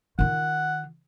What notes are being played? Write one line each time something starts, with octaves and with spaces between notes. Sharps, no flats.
D#3 F4 F#5